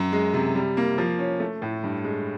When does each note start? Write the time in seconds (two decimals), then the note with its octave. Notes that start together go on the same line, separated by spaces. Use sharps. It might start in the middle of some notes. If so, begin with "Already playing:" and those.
Already playing: F#2
0.12 G#3
0.34 C3
0.55 G3
0.77 A#3
0.98 F3
1.19 C#4
1.40 A3
1.62 A2
1.84 G2
2.04 G#3